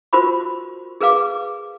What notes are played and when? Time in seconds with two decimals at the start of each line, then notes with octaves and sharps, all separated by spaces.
0.13 F4 F#4 A#4 C5 B5 C#6
1.01 G#4 A#4 B4 F5 D6